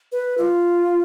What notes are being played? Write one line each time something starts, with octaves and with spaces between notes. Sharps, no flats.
B4
F4